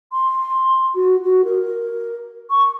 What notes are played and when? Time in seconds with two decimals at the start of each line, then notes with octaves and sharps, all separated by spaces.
0.12 C6
0.95 F#4
1.24 F#4
1.45 A#4
2.50 C#6